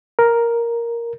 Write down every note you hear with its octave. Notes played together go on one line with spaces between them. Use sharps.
A#4